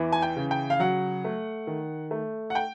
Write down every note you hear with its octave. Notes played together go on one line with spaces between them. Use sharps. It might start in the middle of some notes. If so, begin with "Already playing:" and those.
Already playing: E2 E3
G#5
G5
C#3
G5
F5
F#3 F#5
A3
D#3
A3
F#5
G5